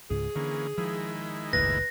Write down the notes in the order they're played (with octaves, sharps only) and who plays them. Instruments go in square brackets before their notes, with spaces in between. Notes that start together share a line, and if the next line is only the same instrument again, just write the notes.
[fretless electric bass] C#2 G#2 [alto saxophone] G#4
[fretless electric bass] D3 [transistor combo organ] E3 A#3 C#4
[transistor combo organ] D#3 G#3 E4 [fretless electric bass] F3
[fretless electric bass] F#1 C#2 A2 [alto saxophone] B4 [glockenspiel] A#6